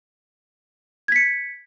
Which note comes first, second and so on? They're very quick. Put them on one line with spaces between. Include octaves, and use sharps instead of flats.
G#6 B6 C#7